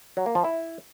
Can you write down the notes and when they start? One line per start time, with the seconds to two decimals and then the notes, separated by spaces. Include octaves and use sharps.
0.17 F#3
0.26 A#3
0.35 F3
0.44 E4